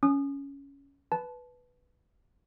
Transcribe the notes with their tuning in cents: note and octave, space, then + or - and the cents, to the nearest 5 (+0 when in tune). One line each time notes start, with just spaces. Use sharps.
C#4 +10 D#6 -30
B4 +0 A5 -20